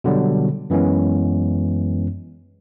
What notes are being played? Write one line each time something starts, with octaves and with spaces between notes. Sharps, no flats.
B2 D3 F#3 G3
F#2 E3 G#3 B3 C#4